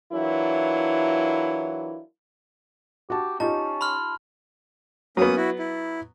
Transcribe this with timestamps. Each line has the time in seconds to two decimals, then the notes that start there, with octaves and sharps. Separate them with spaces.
0.13 E3 F#3 D4 E4 F4 A#4
3.10 F#4 G4 A5
3.40 C#4 D#4 F4 G4 A5
3.81 B5 C6 F6
5.17 F#3 A#3 B3 C#4 D#6
5.36 E4 F#4
5.59 E4